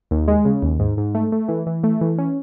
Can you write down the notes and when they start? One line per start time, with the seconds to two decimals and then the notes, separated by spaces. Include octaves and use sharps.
0.11 D#2
0.28 G#3
0.45 C#3
0.62 D#2
0.80 G#2
0.97 G#2
1.15 A3
1.32 A3
1.49 E3
1.67 E3
1.84 A3
2.01 E3
2.18 C#4